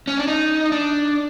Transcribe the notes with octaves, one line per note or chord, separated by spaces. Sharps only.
C#4
D4
D#4
D4